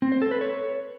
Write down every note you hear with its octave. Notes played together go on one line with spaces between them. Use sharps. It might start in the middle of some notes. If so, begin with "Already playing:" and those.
C4
C5
A4
B4
C#5